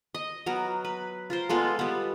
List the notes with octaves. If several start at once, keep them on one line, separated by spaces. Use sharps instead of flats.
D#5
F#3 B3 A#4
B4
F4 A#4 C5
G#3 B3 F4 A4
G3 B3